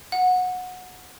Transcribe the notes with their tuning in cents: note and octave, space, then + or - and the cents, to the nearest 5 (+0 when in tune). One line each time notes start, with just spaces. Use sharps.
F#5 -15